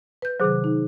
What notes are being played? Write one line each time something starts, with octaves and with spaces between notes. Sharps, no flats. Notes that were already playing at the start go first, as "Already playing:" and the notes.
B4 G6
C3 D#3 F#3 G#4 C5
D#4